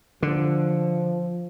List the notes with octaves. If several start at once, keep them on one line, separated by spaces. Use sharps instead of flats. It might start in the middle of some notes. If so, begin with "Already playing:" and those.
D3 F3